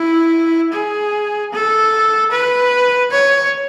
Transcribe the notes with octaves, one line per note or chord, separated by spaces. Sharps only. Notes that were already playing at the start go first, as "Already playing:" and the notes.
Already playing: E4
G#4
A4
B4
C#5